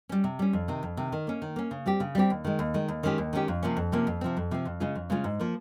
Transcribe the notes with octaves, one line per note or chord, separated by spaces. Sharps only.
G3 C#4
C3
G3 C#4
F2
C3 D#3
F2
C3 D#3
D#3
A#3 C#4
D#3
A#3 C#4
C#3
G3 C4 G4
C#3
G3 C4 G4
D#2
D#3 G#3
D#2
D#3 G#3
D#2
D#3 G#3 C#4 G4
D#2
D#3 G#3 C#4 G4
F2
C3 F3 A#3 C#4
F2
C3 F3 A#3 C#4
F2
C3 F3 C4
F2
C3 F3 C4
F2
C#3 G#3 C#4 F4
F2
C#3 G#3 C#4 F4
G#2
F3 A#3